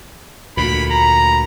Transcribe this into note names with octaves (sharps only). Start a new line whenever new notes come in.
D2 A#2 B5
A#5